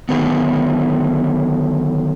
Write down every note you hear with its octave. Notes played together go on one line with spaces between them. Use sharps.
D3 D#3 F#3 B3